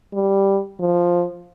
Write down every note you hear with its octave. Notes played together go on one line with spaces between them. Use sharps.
G3
F3